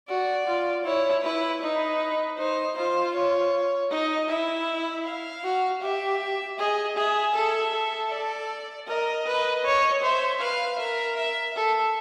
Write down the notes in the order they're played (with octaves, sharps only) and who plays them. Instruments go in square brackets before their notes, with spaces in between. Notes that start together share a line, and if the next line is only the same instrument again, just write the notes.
[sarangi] F#4 [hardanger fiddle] D5
[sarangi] F4
[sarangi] E4 [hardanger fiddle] C#5
[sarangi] E4 [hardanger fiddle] B4
[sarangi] D#4 [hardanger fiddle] B4
[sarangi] D#4 [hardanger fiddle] C5
[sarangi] F4 [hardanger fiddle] C5
[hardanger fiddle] C#5
[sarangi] D#4 [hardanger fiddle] D#5
[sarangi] E4 [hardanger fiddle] E5
[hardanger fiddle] F5
[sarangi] F#4
[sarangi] G4 [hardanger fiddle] E5
[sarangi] G#4 [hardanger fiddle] D#5
[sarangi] G#4 [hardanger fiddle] E5
[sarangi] A4
A4
[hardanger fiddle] D5
[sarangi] A#4 [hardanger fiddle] D#5
[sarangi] B4
C#5
[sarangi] C5 [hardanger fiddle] E5
[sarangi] B4 [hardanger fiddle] F5
[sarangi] A#4 [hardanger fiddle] E5
[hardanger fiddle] E5
[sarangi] A4 [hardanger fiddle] E5